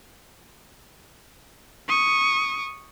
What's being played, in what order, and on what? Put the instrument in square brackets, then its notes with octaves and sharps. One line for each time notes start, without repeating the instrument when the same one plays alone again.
[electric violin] C#6 D#6